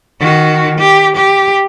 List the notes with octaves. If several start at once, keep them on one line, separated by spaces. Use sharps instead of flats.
D#3 F#4
G4
G4